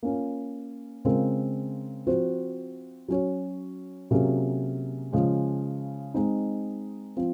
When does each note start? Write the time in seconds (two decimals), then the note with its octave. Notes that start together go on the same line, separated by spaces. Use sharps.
0.03 A#3 C#4 F4
1.05 C#3 G#3 C4 F4 A#4
2.07 F3 C4 F#4 C5
3.08 F#3 C#4 F#4 C#5
4.11 C3 F#3 A#3 C#4 G#4
5.12 C#3 F3 G#3
6.14 G#3 C4 D#4
7.17 F3 C4 F4